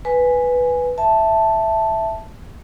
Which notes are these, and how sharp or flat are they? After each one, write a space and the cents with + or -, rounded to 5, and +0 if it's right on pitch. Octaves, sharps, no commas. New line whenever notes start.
B4 +0 G#5 +0
E5 +0 A5 +0